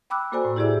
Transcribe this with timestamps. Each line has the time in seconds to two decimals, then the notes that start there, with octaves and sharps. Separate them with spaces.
0.10 G5 B5 D6 E6 F#6
0.32 A#3 F#4 A4 C5 D5 G#5
0.45 A2
0.56 E4 G4 G#4 C5 D5 E5